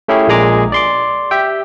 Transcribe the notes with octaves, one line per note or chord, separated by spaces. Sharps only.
A3 C#4 E4 G4 G#4
A#1 A#2 G#3 G#4 A#5 D6
D5 C6 D6
G4 E5 G5